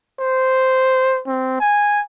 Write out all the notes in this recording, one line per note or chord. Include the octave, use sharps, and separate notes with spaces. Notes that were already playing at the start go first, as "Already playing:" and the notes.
C5
C4
G#5